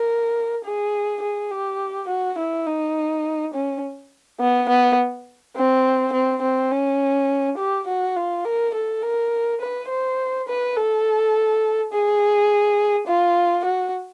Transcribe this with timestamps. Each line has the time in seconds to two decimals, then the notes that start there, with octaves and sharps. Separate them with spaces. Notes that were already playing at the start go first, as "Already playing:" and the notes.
Already playing: A#4
0.64 G#4
1.22 G#4
1.51 G4
2.08 F#4
2.38 E4
2.67 D#4
3.54 C#4
4.40 B3
4.69 B3
5.56 C4
6.13 C4
6.42 C4
6.71 C#4
7.58 G4
7.88 F#4
8.16 F4
8.45 A#4
8.74 A4
9.02 A#4
9.61 B4
9.89 C5
10.48 B4
10.76 A4
11.92 G#4
13.07 F4
13.65 F#4